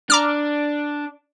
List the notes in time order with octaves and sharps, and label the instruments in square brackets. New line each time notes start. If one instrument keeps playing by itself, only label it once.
[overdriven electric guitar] D4 [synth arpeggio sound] A#5 D6 F6